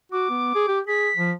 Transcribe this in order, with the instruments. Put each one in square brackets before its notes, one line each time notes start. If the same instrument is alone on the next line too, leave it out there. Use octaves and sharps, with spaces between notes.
[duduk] F#4 [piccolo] D6
[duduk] B3
G#4
G4
[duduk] G#4 [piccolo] B6
[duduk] F3